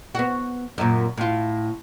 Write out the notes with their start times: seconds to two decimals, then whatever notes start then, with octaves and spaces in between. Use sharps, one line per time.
0.15 B3 F#4
0.78 F#2 A#2
1.17 A2 F4